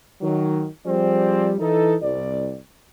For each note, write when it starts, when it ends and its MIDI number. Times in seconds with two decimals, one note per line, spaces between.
0.21 0.65 51
0.21 0.65 54
0.85 1.53 53
0.85 1.53 55
0.85 1.53 60
0.85 1.53 68
0.85 1.53 72
0.85 1.53 74
1.59 1.94 52
1.59 1.94 63
1.59 1.94 69
2.01 2.56 36
2.01 2.56 74